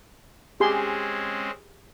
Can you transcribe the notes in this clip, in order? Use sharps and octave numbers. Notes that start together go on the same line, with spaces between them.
G#3 C4 C#4 G4 G#4 C6